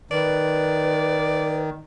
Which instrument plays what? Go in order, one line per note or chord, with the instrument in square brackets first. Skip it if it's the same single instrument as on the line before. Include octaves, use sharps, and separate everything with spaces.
[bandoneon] D#3 [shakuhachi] B4 [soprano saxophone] D5